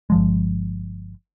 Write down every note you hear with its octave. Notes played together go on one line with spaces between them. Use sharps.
G1 F3 G#3